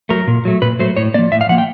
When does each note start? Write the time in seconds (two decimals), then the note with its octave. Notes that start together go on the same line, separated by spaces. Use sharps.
0.09 F#3 A3 A#4
0.27 A#2
0.45 F#3 A3
0.62 A#2 B4
0.79 F#3 A3 C5
0.97 A2 C#5
1.14 F3 A#3 D5
1.32 A2 E5
1.41 F5
1.49 F3 A#3 F#5
1.58 G5